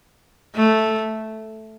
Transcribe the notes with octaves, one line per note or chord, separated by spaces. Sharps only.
A3